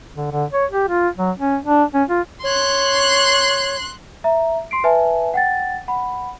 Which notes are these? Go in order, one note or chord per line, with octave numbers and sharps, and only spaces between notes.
D3
D3
C#5
G4
F4
F#3
C#4
D4
C#4
F4
C#5 C6 F#6
E5 A#5
C6 C7 D7
B4 E5 G#5 A5
F#5 G5 A6
F#5 B5